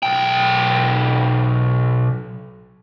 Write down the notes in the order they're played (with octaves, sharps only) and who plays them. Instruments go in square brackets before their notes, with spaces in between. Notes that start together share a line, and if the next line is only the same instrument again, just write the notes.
[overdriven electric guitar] B1 G5